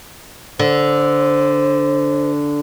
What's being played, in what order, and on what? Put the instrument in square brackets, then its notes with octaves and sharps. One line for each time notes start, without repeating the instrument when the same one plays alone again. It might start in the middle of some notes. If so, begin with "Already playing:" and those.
[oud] D3 [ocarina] C5